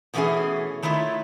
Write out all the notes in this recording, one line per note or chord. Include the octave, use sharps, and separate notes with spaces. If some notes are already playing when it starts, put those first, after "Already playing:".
B2 E3 G#3 A3 C#4 G#4
D#3 A3 E4 F4 C#5